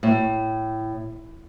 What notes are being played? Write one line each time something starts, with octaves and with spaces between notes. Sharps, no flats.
A2